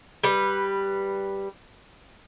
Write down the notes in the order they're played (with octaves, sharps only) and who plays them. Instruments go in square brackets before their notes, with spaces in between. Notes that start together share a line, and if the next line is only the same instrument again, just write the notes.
[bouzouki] G3 B4